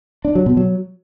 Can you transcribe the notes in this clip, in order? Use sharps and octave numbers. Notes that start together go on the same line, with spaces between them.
D4
F#3
B2
F#3